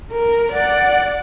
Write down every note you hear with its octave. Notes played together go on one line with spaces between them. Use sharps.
A#4
D5 F#5